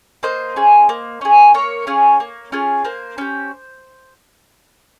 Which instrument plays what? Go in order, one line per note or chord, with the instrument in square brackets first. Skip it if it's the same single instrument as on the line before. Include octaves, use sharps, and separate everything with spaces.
[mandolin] A#3 C5 D#5
C#4 G#4
A#3
C#4 G#4
A#3 A#4 C#5
C#4 F4 G#4
A#3
C#4 F4 G#4
A#3 C5
C#4 G4